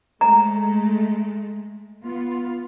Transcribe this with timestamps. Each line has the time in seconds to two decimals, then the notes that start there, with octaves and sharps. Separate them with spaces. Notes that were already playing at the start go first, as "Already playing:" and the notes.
0.21 G#3 A3 A#5
2.04 B3 F4